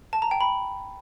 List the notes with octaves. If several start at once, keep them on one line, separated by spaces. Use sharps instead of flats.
A5
A#5
G5
B5